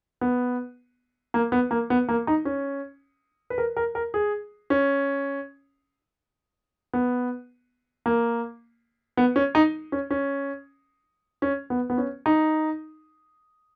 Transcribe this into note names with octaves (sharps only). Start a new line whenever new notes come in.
B3
A#3
B3
A#3
B3
A#3
D#4
C#4
B4
A#4
A#4
A#4
G#4
C#4
B3
A#3
B3
C#4
D#4
C#4
C#4
C#4
B3
B3
C#4
D#4